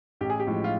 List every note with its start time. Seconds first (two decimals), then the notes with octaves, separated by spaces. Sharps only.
0.21 A1 G4
0.30 G#4
0.40 G4
0.47 A2 F3 G#3
0.64 F4